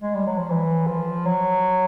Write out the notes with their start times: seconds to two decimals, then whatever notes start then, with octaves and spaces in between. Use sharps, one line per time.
0.02 G#3
0.15 G3
0.26 F#3
0.38 F3
0.50 E3
0.87 F3
1.26 F#3